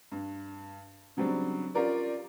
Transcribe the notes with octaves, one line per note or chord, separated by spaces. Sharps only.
G2
C#3 F#3 G3 C4 D4
C#4 F4 G4 A#4 D5